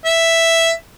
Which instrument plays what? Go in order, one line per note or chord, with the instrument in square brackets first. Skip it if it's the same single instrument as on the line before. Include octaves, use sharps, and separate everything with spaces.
[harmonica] E5